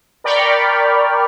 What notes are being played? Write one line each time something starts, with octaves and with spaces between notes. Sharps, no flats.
A#4 D5 G5 B5 C#6 F6